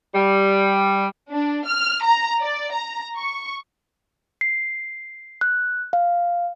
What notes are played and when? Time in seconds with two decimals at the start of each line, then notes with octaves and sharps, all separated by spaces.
0.15 G3
1.30 D4
1.66 F6
2.04 A#5
2.41 D5
2.72 A#5
3.15 C#6
4.41 C7
5.41 F#6
5.93 F5